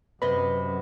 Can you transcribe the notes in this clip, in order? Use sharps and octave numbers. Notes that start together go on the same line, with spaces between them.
F#2 C3 B4 D#5 B5 C6